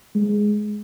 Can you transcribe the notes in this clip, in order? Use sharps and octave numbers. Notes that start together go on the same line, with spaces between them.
G#3